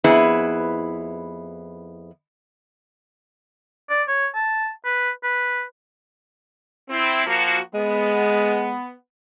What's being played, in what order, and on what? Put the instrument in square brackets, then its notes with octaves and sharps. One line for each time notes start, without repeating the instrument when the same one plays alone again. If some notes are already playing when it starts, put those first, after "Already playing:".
[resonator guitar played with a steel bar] F2 B3 E4 G#4 B4
[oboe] D5
C#5
A5
B4
B4
[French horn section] C4 E4
F3 A#3 F#4
[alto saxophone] G#3 [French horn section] B3